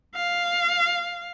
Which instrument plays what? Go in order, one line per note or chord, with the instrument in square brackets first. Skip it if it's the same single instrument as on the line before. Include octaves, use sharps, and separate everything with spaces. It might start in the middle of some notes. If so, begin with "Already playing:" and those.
[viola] F5